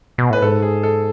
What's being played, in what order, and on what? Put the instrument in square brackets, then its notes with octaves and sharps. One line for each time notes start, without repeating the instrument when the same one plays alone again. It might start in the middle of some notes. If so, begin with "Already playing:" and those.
[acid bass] B2
[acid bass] A2 [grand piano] B4
[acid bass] G#2 [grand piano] A4
[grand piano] G#4
A4